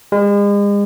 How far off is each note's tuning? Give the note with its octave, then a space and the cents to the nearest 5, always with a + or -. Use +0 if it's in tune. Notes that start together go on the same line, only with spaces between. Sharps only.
G#3 -40